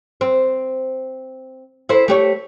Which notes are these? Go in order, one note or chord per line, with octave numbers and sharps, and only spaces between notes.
C4
E4 A4 C5
A3 G4 C#5